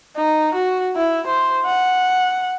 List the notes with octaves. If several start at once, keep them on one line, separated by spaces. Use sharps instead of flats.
D#4
F#4
E4
C5
F#5